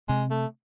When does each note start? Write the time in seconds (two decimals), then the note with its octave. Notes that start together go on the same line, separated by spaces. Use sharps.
0.08 C3 G#3
0.30 A3